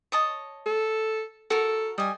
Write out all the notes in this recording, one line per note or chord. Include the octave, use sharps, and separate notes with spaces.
C#5 D#5 A5
A4
F#4 A4 A#4
G3 D#5 G#5